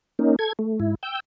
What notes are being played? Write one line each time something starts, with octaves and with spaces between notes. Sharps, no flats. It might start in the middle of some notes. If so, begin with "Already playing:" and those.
A#3 C#4 D#4
A4 G#6
A3
G#2 E4
G5 E6 G6